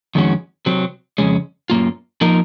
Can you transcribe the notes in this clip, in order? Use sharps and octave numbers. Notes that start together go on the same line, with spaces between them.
F2 D#3 G#3 C#4 F#4
C3 F#3 C4
F2 C#3 G#3 C#4
F#2 D#3 A#3 F4
F3 A#3 D#4 A#4